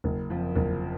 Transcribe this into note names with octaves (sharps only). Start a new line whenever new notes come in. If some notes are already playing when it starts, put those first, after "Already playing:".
F#1
F2 F3
F#1